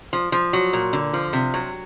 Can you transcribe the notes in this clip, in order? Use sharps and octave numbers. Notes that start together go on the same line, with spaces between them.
F3
F3
F#3
A#2
D3
F3
C3
F#3